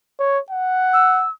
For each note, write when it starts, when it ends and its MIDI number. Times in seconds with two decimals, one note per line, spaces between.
0.19 0.39 73
0.50 1.24 78
0.93 1.30 88